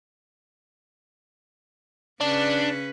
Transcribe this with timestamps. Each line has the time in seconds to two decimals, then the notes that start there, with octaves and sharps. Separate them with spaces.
2.21 C#3 C#4 D4 B4